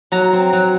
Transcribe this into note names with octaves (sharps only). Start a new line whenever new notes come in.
F#3 A#5
C4
F#3